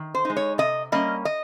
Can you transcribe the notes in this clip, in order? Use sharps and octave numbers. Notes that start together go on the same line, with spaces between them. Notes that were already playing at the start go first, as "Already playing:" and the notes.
Already playing: D#3
C5
G#3 D#4
C#5
C3 D#5
G3 A#3 C#4 D#5
D#5